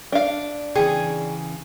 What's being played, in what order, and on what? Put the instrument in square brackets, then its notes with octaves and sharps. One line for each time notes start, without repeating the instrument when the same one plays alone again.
[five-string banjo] D4 F5
[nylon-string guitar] C#3 E3 [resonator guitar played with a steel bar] G#4 [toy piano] G5